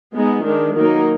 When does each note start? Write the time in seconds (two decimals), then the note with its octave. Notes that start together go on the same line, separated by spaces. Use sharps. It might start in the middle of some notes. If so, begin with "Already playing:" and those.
0.14 G#3 B3 D#4
0.45 D#3 G#3 D4
0.75 D#3 F#3 A#3 D#4 A#4